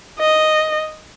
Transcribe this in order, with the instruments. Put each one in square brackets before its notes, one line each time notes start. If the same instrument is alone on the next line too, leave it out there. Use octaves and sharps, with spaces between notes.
[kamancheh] D#5